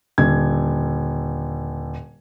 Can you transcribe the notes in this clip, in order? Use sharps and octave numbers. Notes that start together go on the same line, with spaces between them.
D#1 D3 G#6